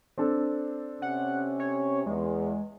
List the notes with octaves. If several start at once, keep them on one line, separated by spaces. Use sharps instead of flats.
C4 D4 A4
C3 C#4 F#5
C#5
E2 G#3